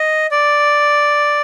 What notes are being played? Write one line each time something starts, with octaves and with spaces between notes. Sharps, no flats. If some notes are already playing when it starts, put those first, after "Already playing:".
Already playing: D#5
D5